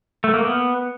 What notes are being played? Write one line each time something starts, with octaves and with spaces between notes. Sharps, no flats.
A3
A#3
B3